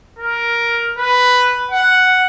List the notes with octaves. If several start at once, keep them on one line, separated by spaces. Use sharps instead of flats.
A#4
B4
F#5